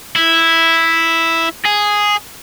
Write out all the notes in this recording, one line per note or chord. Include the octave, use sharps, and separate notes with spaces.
E4
G#4